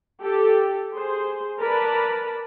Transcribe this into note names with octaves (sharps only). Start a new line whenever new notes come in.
G4 A4
G#4 C5
A#4 B4 D5 A5 B5